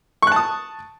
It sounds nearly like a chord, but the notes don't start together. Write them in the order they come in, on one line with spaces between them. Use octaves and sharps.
C#6 F#6 A5 D#6